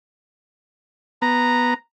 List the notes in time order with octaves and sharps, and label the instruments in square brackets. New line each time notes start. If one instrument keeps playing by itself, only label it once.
[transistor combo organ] B3 [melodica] A#5